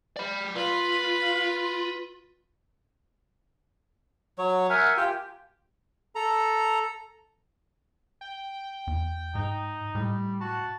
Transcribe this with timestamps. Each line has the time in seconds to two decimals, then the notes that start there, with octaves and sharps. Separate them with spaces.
0.17 D5 B5
0.55 F4 B4 B5
4.38 F#3 C#5
4.70 A#4 E5 F#5 G#5
4.97 F4 G4 G5
6.15 A4 A#5
8.21 G5
8.87 E2
9.35 G#2 D#4
9.95 A2 G3
10.41 F#4 A5